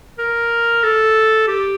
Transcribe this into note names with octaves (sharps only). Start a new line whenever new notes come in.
A#4
A4
G4